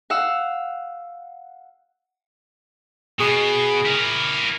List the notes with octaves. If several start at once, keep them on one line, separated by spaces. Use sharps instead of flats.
F5 F#5 E6
B2 G#4
E4 A#4